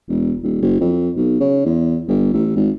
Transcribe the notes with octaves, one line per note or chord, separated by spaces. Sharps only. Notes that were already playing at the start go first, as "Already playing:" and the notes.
E1
D#1
F#1
F2
B1
C#3
E2
G1
A1
G#1